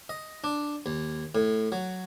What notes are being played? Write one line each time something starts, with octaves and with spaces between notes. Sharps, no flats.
D#5
D4
D#2
A2
F#3